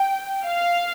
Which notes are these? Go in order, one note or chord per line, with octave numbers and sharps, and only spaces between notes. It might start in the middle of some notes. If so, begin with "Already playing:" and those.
Already playing: G5
F5